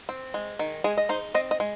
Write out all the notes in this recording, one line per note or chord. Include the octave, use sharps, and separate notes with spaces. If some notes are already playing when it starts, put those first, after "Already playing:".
C4
G#3
D#3
G#3 G#4
D#5
D#4 C5
C4 D#5
D#5
G#3